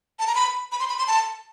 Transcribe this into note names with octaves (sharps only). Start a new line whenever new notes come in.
A5
A#5
B5
B5
C6
B5
C6
A5